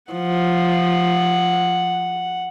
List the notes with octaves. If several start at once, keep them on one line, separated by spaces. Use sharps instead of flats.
F3 F#5